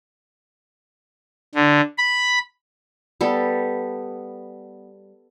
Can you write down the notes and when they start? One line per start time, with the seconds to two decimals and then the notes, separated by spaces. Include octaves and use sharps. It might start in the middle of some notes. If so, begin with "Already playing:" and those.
1.55 D3
1.98 B5
3.21 G3 B3 A4